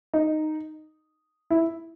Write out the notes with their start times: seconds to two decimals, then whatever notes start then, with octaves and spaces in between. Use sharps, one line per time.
0.14 D#4
1.50 E4